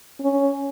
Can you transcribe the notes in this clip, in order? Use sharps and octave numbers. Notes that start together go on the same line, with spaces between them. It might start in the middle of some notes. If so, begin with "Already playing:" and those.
C#4